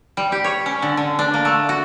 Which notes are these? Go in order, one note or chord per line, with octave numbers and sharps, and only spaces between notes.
G3
G4
C#5
C#4
D3
D3
D4
A#3
A3
F#4